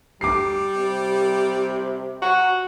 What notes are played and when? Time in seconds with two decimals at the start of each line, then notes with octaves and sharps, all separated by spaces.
0.21 G3 D6 C7
0.75 C3
2.22 F#4